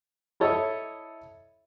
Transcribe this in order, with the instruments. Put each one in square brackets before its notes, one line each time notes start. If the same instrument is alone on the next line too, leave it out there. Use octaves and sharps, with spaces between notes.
[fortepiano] E4 A4 C#5 D#5 E5